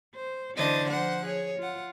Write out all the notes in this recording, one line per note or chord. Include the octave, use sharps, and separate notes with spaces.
C5
D3 E3 D4 C5 D#5 A6
F3 C5 F#5 F#6
G#4 C#5
F4 F#5